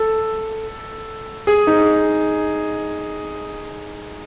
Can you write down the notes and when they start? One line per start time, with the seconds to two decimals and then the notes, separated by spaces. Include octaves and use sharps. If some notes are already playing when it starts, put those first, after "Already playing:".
Already playing: A4
1.47 G#4
1.67 D#4